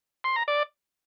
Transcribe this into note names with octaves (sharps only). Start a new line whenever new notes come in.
C6
A#5
D5